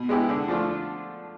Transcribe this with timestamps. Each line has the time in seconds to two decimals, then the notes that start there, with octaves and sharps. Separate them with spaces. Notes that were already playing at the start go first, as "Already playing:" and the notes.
Already playing: B2
0.09 G#3 B3 E4 G4
0.29 D3
0.48 F3 A3 D4 F4